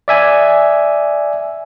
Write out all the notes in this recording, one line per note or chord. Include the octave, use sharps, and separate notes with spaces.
D5 E5 G#5